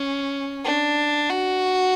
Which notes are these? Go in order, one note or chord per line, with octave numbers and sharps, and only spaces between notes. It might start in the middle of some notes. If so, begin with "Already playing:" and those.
Already playing: C#4
D4
F#4